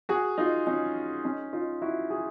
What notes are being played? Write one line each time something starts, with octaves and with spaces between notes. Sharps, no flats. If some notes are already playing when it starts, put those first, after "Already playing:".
F#4 G#4
D#4 F4
C#4 D#4
C#4 D#4
D#4 F4
E4 F#4
F#4 G#4